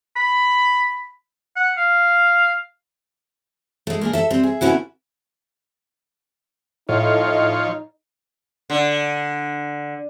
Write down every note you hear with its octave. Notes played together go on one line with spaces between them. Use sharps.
B5
F#5
F5
G#3 A3
A#3 D4 G#4
A4 E5
G3 C4
G#4 E5
D3 B3 C#4 D#4 E4 F#4
A2 F3 D#4 F4 C#5 D#5
D3